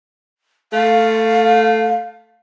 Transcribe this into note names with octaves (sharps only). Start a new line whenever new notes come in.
A3 F5